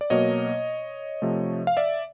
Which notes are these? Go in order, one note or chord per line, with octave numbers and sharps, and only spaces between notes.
D5
B2 F#3 A#3 C#5 D#5
C3 F3 A3
F5
D5 E5